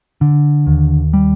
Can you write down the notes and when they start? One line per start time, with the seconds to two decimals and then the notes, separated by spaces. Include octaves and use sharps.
0.21 D3
0.67 D#2
1.13 G3